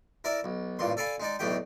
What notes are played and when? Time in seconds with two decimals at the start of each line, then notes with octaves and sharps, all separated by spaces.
0.24 E4 A#4 D5 E5
0.44 B1
0.79 A1 G2 A#2 C6
0.97 A4 D5 F5 G#5 B5
1.20 G#3 D#4 D5
1.39 B1 E2 A2 A3 G4 G5